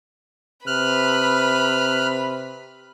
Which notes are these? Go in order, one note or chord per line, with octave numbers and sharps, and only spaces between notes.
C3 B4 B5 F6 F#6